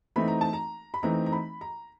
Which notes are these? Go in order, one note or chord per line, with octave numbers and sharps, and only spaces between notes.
E3 A3 C4 D#4 B5
A#5
A5
A#5
B5
E3 A3 C4 D#4 A#5
A#5
B5
A#5